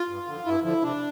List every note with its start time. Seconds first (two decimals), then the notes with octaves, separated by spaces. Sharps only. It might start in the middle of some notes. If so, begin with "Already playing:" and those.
Already playing: F4
0.09 G2
0.27 D3 F3
0.46 G2 E4
0.63 D3 F3 E4
0.82 C3 D4